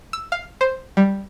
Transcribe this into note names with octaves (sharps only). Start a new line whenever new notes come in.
E6
F5
C5
G3